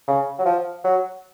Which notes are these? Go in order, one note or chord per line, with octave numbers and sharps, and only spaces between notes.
C#3
F#3
F3
F#3